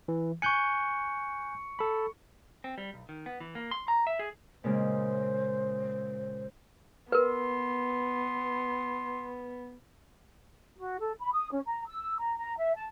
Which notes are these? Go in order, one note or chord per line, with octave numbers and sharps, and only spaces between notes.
E3
G#5 C#6 F#6 G6 C#7
A4 B5
C4
G3
B1
D#3
B3
E3
A#3
C6
A#5
E5
G#4
A#2 C#3 G#3 C5
B3 A#4 B4 C6
F#4
A4
B5
D#6
C#4
A#5
E6
A#5
A#5
E5
A5